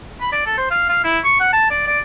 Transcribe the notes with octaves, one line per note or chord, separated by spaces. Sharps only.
B5
D5
A4
C5
F5
F5
E4
C#6
F#5
A5
D5
D5